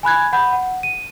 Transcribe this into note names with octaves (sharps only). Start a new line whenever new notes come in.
G#5 B5 F#6 G#6
F#5 B5 G6
F#5
D#7